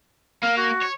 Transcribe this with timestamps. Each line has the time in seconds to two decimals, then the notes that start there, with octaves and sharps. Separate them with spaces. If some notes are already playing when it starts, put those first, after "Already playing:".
0.43 A#3 F5
0.57 F#4
0.82 C#5